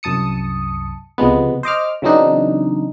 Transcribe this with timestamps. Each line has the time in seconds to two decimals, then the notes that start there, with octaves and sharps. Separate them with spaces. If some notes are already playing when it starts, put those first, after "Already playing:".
0.03 C2 F#2 A5 D#6 C#7
1.18 C#2 C3 F3 G#3 B3
1.63 C5 D#5 D6 F6
2.02 C#3 E3 F#3 C4 D4 D#4